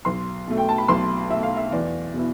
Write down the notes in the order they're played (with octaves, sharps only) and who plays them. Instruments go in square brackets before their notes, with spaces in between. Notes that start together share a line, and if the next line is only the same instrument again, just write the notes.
[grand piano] B1 C6
B2 A3
G5
A5
B5
B1 C6
B2 A3 E5
F5
E5
E2 D5
B2 B3 E4